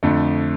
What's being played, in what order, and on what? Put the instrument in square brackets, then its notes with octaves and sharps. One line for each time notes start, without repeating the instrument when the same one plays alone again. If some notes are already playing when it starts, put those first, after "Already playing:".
[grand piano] F2 D3 A3